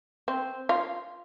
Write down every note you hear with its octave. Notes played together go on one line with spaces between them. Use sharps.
C4
F4